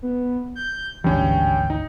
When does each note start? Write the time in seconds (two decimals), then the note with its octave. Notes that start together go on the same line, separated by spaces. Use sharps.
0.02 B3
0.55 G6
1.04 G#1 D2 G2 E3 C#4 G5
1.70 D#4